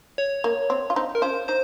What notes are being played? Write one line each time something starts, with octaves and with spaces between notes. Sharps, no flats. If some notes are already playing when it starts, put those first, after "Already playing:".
C#5
A#3
C4
F4
C4 D#4
A#4
C#4 F4 C5
D#4 C5